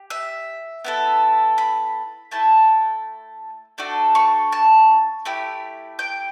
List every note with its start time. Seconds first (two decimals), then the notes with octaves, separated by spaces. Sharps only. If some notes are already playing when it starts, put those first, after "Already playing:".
Already playing: G4
0.10 E5
0.85 B3 E4 A4
1.58 B5
2.31 A3 E4 A4 A5
3.78 A3 D4 F#4 A4
4.15 C#6
4.52 A5
5.25 A3 E4 G4
5.99 G5